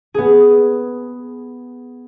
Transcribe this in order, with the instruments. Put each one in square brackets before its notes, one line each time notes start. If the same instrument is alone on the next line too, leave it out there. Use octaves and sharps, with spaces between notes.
[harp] B3 G#4